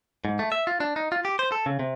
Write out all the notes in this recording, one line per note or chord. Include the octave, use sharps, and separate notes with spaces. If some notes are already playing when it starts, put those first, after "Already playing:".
G#2
A3
E5
F4
D4
D#4
F4
G4
C5
A4
C#3
C3